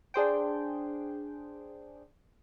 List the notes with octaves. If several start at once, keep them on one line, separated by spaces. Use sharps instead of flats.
D4 G#4 C5 G5